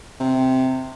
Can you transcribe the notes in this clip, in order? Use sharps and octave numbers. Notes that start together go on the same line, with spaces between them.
C3